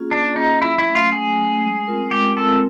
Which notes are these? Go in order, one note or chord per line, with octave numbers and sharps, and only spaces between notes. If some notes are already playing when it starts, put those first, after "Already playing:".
Already playing: A#3 C#4 F4 G#4
A#3 D4
C#4 D#4 F4 G#4
F#3 E4
E4
A3 C#4
F4
F#3 G#4
A3 C#4
G#3
C4 F4 A#4
G#3 G4
C4 F4 A4 A#4